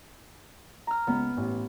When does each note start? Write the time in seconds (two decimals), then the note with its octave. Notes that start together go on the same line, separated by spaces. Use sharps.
0.87 A#5 F6
1.07 C#2 B3
1.37 A1